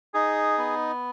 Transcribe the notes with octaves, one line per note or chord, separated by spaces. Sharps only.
D#4 G#4
B3